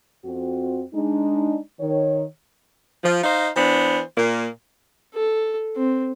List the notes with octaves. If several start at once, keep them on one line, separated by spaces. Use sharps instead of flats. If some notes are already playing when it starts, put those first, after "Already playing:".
F2 C4 F#4
G#3 D4 D#4
D#3 C#5
F3
D#4 C5 D#5 F5
E3 B3 D4 C5
A#2 A#3
A4
C4